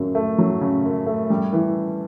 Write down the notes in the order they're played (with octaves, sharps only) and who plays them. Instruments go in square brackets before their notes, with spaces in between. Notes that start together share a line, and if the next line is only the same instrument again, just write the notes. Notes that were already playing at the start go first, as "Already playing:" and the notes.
Already playing: [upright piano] F#2 C#3 F#3
A3
F#3
C#3
F#2
A3
G3
E3